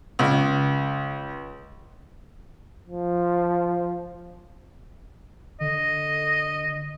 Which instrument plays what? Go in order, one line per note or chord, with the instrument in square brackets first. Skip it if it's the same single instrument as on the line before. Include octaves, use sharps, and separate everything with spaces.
[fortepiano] C#2
[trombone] F3
[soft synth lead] D3 [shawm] D#5